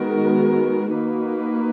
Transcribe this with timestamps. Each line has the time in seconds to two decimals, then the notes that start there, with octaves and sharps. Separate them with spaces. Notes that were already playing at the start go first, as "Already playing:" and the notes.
Already playing: D#3 G#3 B3 F#4 A#4
0.93 A#3 D#4 F#4 B4